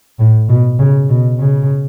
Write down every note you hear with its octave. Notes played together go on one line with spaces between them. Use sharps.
A2
B2
C#3
B2
C#3